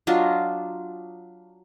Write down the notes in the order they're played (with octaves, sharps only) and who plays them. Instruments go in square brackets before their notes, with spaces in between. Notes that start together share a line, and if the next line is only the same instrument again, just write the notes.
[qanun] F#3 D4 F4 D#5